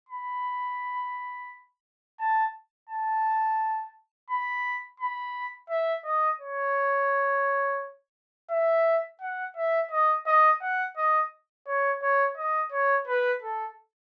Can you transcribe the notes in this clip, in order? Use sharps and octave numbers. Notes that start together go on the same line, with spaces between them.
B5
A5
A5
B5
B5
E5
D#5
C#5
E5
F#5
E5
D#5
D#5
F#5
D#5
C#5
C#5
D#5
C#5
B4
A4